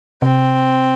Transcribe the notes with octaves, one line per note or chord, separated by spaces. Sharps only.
C3 C4